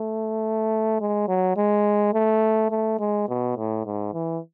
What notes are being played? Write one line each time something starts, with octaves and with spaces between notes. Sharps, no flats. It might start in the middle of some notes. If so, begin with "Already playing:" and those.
Already playing: A3
G#3
F#3
G#3
A3
A3
G#3
B2
A2
G#2
E3